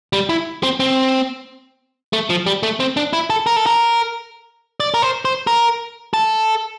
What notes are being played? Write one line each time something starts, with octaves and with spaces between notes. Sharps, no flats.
G3
E4
C4
C4
A3
F3
G3
A3
C4
D4
E4
A4
A#4
A4
A#4
D5
A#4
C5
C5
A#4
A4